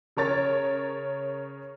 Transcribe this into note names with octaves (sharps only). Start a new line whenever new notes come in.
C#3 A#4 C#5 A6